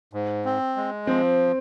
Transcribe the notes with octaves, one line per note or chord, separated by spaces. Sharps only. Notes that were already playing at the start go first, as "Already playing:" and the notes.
G#2
C4
G#3
F3 C4